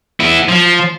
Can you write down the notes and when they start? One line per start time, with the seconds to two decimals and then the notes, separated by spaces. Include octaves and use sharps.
0.20 B3 E4
0.49 F3